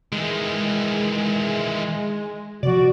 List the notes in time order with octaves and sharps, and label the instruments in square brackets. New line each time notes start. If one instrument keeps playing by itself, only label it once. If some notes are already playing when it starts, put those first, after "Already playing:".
[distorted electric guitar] D#3 E3 [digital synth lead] G#3
[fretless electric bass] C3 F3 [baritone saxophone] F#4 [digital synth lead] D5